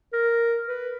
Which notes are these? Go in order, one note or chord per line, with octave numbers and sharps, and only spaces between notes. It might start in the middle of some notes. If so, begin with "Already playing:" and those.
A#4
B4